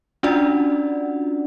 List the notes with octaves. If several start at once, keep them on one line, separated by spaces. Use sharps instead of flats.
C#4 D4 F4 F#4 D5 F#5